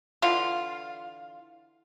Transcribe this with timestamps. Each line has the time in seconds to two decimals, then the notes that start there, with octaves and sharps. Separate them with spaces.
0.22 D3 E3 F4